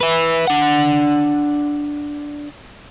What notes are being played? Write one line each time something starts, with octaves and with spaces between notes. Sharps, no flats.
B4 E5
D4 F#5